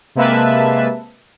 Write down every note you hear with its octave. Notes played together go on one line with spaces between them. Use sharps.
C3 G#3 A#3 B4 E5 A5